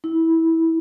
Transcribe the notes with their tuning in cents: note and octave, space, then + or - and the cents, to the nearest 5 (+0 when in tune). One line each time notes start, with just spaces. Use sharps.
E4 -15